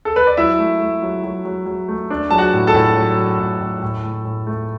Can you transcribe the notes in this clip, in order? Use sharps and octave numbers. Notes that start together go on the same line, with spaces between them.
A4
B4
D5
F#3 E4 E5
A3
A3
F#3
F#3
F#3
F#3
A3
D4
F#3 A5
F#4 F#5
A2
A4 A5
A2
F#3
F#3
A2
A2
A2
A2
A2
A3